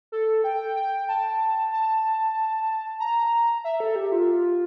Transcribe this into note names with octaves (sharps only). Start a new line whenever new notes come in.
A4
G5
G5
A5
A5
A#5
E5
A4
G4
F4